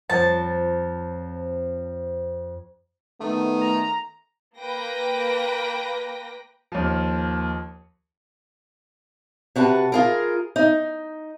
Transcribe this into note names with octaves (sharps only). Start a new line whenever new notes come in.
F2 C4 C#5 A5
D#3 A3 B3
A#5
A#3 B4 G5 A#6
D#2 F3
C3 F#4 B4 A5
F4 G#4 A#4
D#4